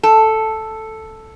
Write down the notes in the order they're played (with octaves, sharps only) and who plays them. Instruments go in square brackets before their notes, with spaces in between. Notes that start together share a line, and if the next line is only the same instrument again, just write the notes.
[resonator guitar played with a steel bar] A4